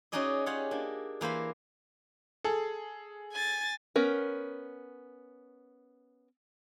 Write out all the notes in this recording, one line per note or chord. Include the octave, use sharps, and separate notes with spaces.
C#4 D#4 F#4 G#4 D5 D#5
F4 G4 G#4 C#5 F#5
A#3 D4
E3 A#3 C5 B5
G#4 A4
G#5 A6
B3 C#4 A#4